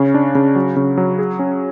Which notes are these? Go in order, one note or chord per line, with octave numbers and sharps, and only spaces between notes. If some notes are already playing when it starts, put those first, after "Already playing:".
Already playing: C#3 C#4
D4
C#3
F#3
C#3
F#3
G#4
C#4